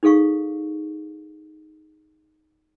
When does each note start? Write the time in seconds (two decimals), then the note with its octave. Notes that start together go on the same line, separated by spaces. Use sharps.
0.03 D#4 G#4 A4 F5 C#6